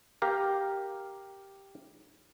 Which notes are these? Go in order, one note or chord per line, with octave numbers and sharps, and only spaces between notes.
G4 A#4 F5